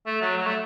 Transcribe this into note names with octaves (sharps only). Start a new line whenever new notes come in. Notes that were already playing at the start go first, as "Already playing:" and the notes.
A3
F#3
F#3
A3